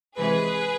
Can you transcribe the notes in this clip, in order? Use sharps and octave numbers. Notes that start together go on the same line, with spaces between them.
C3 E3 G#3 G#4 B4